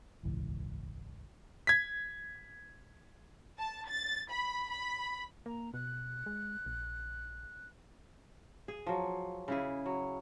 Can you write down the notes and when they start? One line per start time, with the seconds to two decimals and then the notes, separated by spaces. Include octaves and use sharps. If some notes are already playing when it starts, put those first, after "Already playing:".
0.23 D#1 G#1 C#2 E3
1.67 G#6 B6
3.59 A5
3.90 A6
4.31 B5
4.70 B5
5.46 A#3 A#5
5.74 B2 F#6
6.26 G#3
6.66 A#1
8.68 G#4
8.87 F3 F#3
9.48 C#3 E4 G#4
9.86 F#3